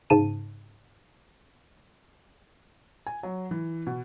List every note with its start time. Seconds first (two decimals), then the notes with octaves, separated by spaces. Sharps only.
0.10 G#2 C#3 A5 D#7
3.07 G#5
3.23 F#3
3.51 E3
3.87 B2